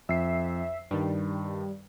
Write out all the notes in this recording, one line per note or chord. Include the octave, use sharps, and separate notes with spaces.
F2 E5 C7
G2 D#3 G3